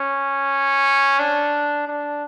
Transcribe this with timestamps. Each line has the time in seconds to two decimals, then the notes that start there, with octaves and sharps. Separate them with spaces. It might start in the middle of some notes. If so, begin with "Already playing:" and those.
Already playing: C#4
1.19 D4
1.88 D4